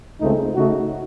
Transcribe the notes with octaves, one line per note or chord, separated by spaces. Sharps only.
C#2 C#3 A3 C4 D#4
C#3 A3 D#4 F#4